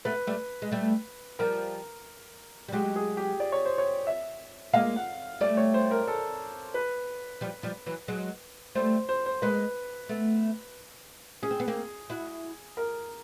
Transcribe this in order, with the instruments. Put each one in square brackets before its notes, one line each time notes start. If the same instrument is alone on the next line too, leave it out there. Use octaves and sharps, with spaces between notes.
[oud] A3 B3 [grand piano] B4
[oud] G3 A3
G#3
G3 A3
[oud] F3 G3 [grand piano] A#4
[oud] G3
[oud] F#3 G#3 [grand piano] G4
[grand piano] G#4
G4
D5
C#5
C5
C#5
E5
[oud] G#3 A#3 [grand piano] F5
[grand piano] F#5
[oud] G3 A3 [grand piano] D5
[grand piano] C#5
C5
A#4
A4
B4
[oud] F3 G3
F3 G3
E3 F#3
F#3 G#3
[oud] G3 A3 [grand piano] C5
[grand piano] C5
C5
[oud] G#3 A#3 [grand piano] B4
[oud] A3 B3
[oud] C#4 [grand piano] G#4
[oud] C4
B3
A#3 C4
E4 F#4
[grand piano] A#4